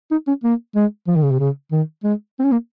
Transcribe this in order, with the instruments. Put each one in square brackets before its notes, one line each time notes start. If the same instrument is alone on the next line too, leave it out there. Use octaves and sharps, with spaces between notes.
[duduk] D#4
C#4
A#3
G#3
F3
D#3
C#3
C3
C#3
D#3
G#3
C4
C#4
A#3